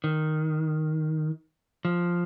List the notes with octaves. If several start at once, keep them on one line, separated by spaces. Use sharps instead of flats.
D#3
F3